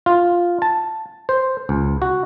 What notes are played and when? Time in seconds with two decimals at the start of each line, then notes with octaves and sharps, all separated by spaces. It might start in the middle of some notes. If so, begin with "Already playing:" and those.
0.06 F4
0.62 A5
1.29 C5
1.69 C#2
2.02 F#4